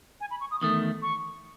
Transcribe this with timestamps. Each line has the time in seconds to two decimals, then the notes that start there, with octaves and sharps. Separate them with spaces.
0.21 G#5
0.31 B5
0.41 C#6
0.51 D#6
0.62 E2 D#3 A3 D#6
1.02 C#6